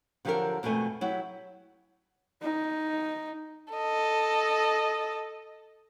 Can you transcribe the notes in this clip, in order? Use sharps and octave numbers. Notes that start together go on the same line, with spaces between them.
D3 F3 F#3 G4 A4 A#4
F2 B2 G#3 A3 G#5
F#3 E4 G4
D#4
A4 D#5